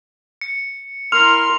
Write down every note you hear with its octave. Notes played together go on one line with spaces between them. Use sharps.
C#7
E4 A#4 C6 F6 F7